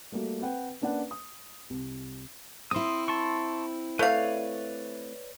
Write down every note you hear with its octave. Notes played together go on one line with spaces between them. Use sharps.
G3 A3 A#3 F#4
C4 B4 F#5 G5
A#3 C#4 D4 B4 F#5
D#6
C2
C4 E4 C6 D#6
A5 C6 C#6
A3 B4 C#5 D5 F5